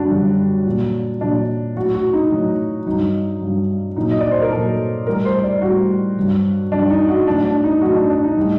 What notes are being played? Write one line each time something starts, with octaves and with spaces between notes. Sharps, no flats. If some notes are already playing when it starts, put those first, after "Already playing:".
Already playing: F#2 D3 G3 D4 F#4
F#2 D3 G3
A#2 F#3
A#2 F#3 D4
A2 F#3 F#4
F#4
D#4
A2 F#3
G2 F#3 D#4
G2 F#3
A#2 F#3 D#4
D#5
D5
C5
A#4
A#2 F#3 A4
A2 G3 A#4
C5
D5
A2 G3 F#4
G2 F#3
G2 F#3 D4
D#4
F#4
A2 F#3 D4
D4
D#4
A2 F#3 F#4
D4
D4
D#4
A2 G3